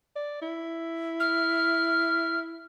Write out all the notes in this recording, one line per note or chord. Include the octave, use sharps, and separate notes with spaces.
D5
E4
F6